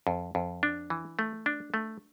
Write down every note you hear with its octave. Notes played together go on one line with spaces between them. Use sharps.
F2
F2
D4
E3
A3
D4
A3